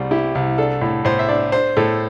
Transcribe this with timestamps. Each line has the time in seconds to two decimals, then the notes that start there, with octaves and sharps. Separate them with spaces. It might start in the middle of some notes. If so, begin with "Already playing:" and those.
Already playing: C2 G3 C5
0.11 E4 G4
0.35 C2
0.58 D4 A4
0.81 A2
1.05 A2 C5
1.19 E5
1.29 D4 D5
1.52 D4 C5
1.77 A2 A4